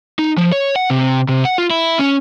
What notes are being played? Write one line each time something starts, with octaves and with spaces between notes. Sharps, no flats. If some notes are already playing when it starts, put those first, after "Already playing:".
D#4
F3
C#5
F#5
C3
C3
F#5
F4
E4
C#4